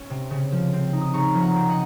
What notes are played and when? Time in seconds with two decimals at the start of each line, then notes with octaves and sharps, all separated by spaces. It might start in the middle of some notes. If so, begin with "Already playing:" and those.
Already playing: C#4
0.10 C3
0.31 C#3
0.52 F3
0.73 C4
0.93 D#4
1.01 D#6
1.14 C#3 A#5 C#6
1.35 F3
1.42 F#5 A#5
1.56 C4
1.69 D#5 F#5